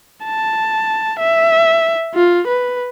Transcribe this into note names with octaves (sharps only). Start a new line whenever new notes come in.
A5
E5
F4
B4